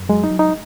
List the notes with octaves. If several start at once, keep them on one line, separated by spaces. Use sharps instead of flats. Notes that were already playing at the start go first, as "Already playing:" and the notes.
Already playing: F#2
F#3 G#3
D#4
F#3
D#4